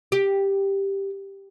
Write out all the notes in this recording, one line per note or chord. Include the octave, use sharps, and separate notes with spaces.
G4